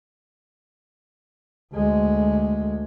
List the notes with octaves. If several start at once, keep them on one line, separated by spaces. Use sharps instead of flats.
D2 G#3